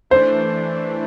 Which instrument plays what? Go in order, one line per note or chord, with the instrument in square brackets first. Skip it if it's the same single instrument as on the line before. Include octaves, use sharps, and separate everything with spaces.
[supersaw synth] E3 A3 D4 [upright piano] C5